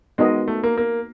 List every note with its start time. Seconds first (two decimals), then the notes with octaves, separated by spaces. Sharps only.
0.18 G#3 B3 D#4 F#4 A#4 D#5
0.48 A3
0.63 A#3
0.77 A#3